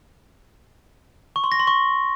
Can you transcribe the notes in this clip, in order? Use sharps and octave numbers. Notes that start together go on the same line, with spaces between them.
C#6
C6
A#6
C6
C#6